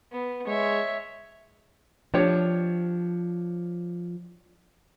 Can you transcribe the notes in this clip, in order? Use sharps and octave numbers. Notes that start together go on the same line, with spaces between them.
B3
G#3 C#5 E5
F3 D4 G4 C#5